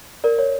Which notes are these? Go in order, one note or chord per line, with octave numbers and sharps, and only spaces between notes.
A#4 D5
C#5